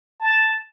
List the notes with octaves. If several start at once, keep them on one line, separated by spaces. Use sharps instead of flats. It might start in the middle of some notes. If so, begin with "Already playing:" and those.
A5